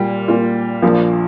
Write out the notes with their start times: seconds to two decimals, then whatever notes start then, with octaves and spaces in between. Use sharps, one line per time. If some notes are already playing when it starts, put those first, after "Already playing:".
Already playing: A#2 G3 A#3 F4
0.28 A#2 A#3 F4
0.82 A#1 A#2 F3 A#3